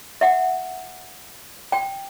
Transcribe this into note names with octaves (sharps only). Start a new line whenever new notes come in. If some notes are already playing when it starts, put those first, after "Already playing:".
E5 F#5
G5